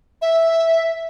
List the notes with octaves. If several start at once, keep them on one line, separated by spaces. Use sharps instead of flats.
E5